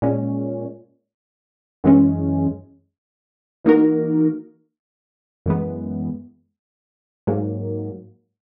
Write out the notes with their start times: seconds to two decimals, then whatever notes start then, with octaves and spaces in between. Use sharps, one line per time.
0.02 A#2 G#3 C#4
1.84 F#2 E3 G#3 C#4
3.64 E3 A#3 D#4 F#4 A#4
5.46 F#2 E3 G#3 B3
7.27 G#2 F#3 A#3